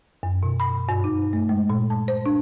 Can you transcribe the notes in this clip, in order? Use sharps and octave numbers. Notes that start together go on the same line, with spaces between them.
F#2
B2
B5
G2
D#4
A3
G#3
A#2
A5
C5
D4